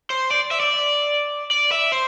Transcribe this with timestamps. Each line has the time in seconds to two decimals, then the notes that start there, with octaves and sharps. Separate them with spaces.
0.10 C5
0.30 D5
0.51 E5
0.60 D5
1.51 D5
1.72 E5
1.92 C5